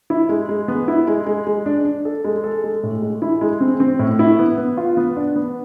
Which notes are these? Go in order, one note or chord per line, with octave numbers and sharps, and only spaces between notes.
E4
G#3
G#3
B3
E4
G#3
G#3
G#3
D4
D4
A4
G#3
A4
G#3
A2
G#3
E4
G#3
C4
C4
A2
E4
B3
B3
F4
B3
D4
B3